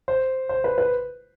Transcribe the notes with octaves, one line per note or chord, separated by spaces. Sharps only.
C5
C5
B4
B4